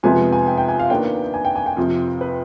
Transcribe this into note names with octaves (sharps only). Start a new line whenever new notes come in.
F2 C3 F3 G#3 B3 G#5
G#5
G5
G5
G#5
F5
D#2 D#3 B3 D4 G5
G#5
G5
G#5
G5
F2 C3 F3 C4
B4